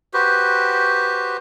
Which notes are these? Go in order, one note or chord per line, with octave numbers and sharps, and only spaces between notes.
F#4 G4 B4 C5